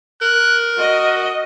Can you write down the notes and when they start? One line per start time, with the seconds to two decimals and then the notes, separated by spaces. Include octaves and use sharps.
0.22 A#4 F#6
0.79 F#4 D#5